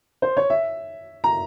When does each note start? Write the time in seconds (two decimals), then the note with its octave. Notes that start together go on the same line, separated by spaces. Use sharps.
0.22 C5
0.37 C#5
0.50 E5
1.24 A#5